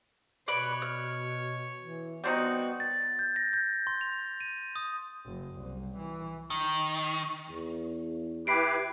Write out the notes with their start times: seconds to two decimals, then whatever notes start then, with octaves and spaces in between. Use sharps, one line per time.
0.48 B2 B4 C#5 D5
0.82 F6
1.80 E3
2.24 G3 B3 C4 D#4 F#4
2.80 A6
3.19 G6
3.36 A#6
3.53 G6
3.87 C6
4.01 F7
4.40 D#7
4.76 D#6
5.25 F#1
5.56 C2
5.98 E3
6.50 D#3
7.49 E2
8.47 E4 G4 B4 B5 C7 D7